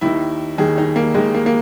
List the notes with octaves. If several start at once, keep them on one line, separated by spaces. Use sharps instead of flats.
D#2 D#3 E4
D#2 D#3 G#4
D#4
A#3
D#2 D#3 G#3
A#3
A#3